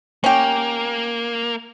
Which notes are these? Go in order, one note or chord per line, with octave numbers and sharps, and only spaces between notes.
A#3 C#4 G4